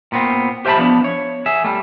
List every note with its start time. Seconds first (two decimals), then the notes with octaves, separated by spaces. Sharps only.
0.12 A#2 B3 C4
0.65 G4 C5 E5 G5 A5 B5
0.77 F3 B3 D4
1.04 C#5
1.46 G#4 E5
1.64 G3 A3